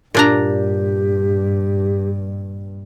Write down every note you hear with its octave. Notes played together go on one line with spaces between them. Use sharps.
G2 A#2 D4 G4 A#5